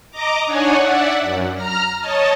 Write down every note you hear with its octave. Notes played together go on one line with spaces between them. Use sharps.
D#5 A#5 D6
D4 D#4 C#5 F#5 G#5
D5 E5 F#5
F#2
A#5 F6
C#5 D#5 A5